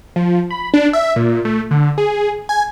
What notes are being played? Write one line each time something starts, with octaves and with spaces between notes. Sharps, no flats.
F3
B5
D4
E5
A#2
A3
D3
G#4
G#5